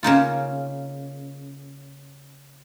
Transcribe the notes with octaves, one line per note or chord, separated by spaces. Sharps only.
C#3 A#3 D#4 F4